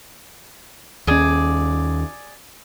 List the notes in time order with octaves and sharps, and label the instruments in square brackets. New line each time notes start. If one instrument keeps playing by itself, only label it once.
[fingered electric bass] D#2 C#4 [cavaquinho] G#4 D5